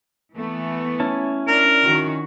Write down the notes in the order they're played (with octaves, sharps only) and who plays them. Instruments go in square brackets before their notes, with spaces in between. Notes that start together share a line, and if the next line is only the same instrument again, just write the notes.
[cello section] E3 A3 B3
[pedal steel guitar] C#4 E4 A5
[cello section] D4 [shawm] A#4
[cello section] D#3 F#4